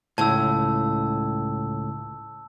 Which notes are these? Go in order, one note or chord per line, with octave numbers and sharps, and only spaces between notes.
C#2 A2 A5 E6